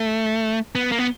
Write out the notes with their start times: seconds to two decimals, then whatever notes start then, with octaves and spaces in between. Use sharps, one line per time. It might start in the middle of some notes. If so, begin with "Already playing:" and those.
Already playing: A3
0.75 B3
0.92 A#3
0.98 B3